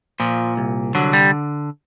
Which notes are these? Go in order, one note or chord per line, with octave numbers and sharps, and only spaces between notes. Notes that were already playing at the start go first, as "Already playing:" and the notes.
A#2 F3
C2
D3 F#3
G3